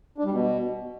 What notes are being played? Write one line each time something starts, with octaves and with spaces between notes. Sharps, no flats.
D4
G3
B2